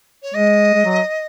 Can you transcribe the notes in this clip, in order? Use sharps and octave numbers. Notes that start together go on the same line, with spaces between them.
C#5
G#3 D#5
G#3
F#3